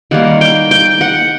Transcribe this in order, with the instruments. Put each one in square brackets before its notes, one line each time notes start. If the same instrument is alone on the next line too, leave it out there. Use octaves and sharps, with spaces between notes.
[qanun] D#3 G3 A#3 F#5
G5
G5
F#5